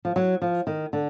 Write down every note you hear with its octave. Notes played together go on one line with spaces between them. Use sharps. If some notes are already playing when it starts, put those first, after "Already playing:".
F3
F#3
F3
D#3
D3